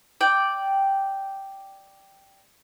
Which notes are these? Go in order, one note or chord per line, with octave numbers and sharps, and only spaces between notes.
D5 G5